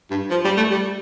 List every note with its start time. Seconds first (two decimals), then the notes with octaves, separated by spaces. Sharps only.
0.10 G2
0.30 F3
0.44 G3
0.57 A3
0.71 G3